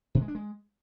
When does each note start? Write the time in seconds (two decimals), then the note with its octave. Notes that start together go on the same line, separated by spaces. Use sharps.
0.15 B2
0.21 G#3
0.28 D4
0.35 G#3